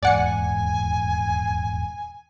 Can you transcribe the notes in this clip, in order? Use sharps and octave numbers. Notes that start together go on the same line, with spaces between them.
D#1 E2 G#2 D5 F#5 G#5 C#7